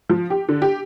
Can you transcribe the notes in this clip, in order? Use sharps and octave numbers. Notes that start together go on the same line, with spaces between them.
F3
G4
D3
G4